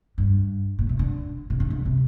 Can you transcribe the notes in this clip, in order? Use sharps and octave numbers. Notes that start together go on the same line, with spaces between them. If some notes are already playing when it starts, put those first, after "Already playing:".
G2
A#2
C3
D3
C3
D3
D3
C3